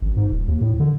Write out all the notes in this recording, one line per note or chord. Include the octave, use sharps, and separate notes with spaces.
G#1
G#2
D#1
D#2
A2
D3